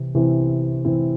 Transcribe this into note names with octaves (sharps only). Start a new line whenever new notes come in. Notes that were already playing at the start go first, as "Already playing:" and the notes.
Already playing: C3 E3 C4 E4
C3 E3 C4 E4
C3 E3 C4 E4